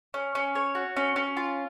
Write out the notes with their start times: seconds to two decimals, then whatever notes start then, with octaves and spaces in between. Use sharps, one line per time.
0.14 C#4
0.35 C#4
0.55 C#5
0.75 F#4
0.96 C#4
1.16 C#4
1.37 F4